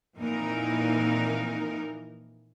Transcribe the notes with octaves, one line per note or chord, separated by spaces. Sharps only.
F2 A#2 E3 D#4 A#4